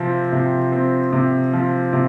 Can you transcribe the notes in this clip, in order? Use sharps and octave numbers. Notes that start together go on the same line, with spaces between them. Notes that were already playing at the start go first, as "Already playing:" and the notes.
Already playing: C3 F3 C4
C3
C4
C3
F3
C3